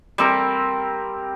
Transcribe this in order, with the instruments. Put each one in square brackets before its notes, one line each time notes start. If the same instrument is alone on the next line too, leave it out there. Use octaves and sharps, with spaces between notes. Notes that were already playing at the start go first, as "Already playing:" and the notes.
[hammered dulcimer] G3 C4 A#4